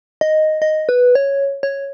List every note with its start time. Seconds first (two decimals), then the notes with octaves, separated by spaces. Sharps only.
0.21 D#5
0.62 D#5
0.89 B4
1.15 C#5
1.63 C#5